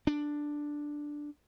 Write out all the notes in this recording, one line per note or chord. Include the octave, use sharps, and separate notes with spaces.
D4